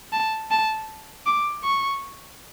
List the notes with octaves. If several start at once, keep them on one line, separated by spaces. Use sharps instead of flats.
A5
A5
D6
C#6